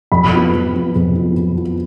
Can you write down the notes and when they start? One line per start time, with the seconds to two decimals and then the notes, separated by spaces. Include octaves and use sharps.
0.12 F2 B5
0.33 F3 B3 F4
0.54 F2
0.74 F3 B3 F4
0.95 F2
1.16 F3 B3 F4
1.37 F2
1.58 F3 B3 F4